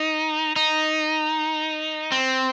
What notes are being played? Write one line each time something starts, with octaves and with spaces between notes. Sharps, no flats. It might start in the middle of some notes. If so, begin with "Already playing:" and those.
Already playing: D#4
D#4
C4